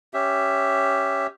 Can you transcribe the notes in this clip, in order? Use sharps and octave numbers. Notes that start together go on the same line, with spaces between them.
C#4 G4 E5